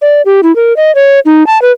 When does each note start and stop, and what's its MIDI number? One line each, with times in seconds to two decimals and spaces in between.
0.02 0.22 74
0.26 0.41 67
0.43 0.54 64
0.56 0.76 70
0.77 0.94 75
0.95 1.20 73
1.25 1.46 63
1.47 1.60 81
1.62 1.72 71